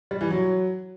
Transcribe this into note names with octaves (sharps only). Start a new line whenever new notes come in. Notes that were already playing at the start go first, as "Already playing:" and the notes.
G3
E3
F#3